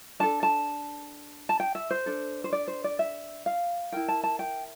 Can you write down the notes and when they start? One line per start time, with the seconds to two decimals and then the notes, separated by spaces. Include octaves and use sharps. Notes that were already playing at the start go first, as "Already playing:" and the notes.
0.20 D4 A4 A5
0.43 A5
1.49 A5
1.60 G5
1.75 E5
1.90 C5
2.06 D4 A4
2.44 C5
2.52 D5
2.68 C5
2.84 D5
2.99 E5
3.46 F5
3.92 E4 A#4 G5
4.08 A5
4.24 A5
4.39 G5